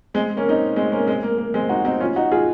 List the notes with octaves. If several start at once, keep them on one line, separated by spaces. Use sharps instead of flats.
G#3 C4
A#3 C#4
C4 D#4
G#3 C4
A#3 C#4
G#3 C4
A#3
A#3
G#3 C4
D#4 F#4
C4 D#4
C#4 F4
D#4 F#4
F4 G#4